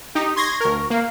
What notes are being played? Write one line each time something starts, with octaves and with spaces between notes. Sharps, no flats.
D#4 G4 D#6
C6 C#6 G#6 A#6
D2 A#4
A#3 F5